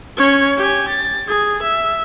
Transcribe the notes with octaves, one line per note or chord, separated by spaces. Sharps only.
C#4 C#5
G4 G#5
A6
G#4
E5